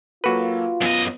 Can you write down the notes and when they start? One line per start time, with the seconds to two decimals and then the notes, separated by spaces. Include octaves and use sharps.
0.24 F#3 A#3 F4 F#4 A4 B4
0.81 F#2 B3 D#5